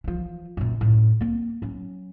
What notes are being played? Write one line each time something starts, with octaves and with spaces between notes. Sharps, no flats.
E3 F3
F#2 A#2
F#2 A2
A#3 C4
F#3 C#4